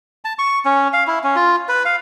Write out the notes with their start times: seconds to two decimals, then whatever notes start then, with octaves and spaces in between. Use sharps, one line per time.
0.25 A5
0.39 C#6
0.65 C#4
0.93 F5
1.07 E4
1.23 C#4
1.36 F4
1.69 B4
1.85 F5